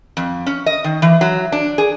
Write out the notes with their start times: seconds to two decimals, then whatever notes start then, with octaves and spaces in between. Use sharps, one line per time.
0.17 F2
0.46 C#4
0.66 D#5
0.84 D#3
1.02 E3
1.21 F#3
1.52 D4
1.78 G#4